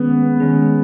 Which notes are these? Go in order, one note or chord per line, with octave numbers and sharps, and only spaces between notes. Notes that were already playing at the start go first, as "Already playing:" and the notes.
Already playing: D#3 G#3 B3 C#4 G#4
D#3 G#3 C#4 G#4